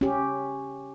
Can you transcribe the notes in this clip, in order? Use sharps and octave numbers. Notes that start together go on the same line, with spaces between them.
C#4 G4